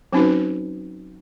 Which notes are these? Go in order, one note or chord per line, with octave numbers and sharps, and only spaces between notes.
F#3 C4 C#4 D#4 F#4 B4